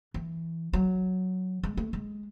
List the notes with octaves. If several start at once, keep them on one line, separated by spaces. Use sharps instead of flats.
E3
F#3
G#3
A3
G#3